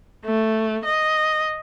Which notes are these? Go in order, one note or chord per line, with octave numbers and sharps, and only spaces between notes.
A3
D#5